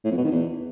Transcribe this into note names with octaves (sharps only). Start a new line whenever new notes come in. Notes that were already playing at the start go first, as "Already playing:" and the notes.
A2
F2
B2
D#3
E2